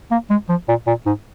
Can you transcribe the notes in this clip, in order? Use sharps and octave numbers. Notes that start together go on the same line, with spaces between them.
A#3
G#3
F3
A#2
A#2
G#2